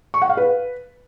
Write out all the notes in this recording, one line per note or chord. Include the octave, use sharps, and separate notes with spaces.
C#6
F#5
F5
B4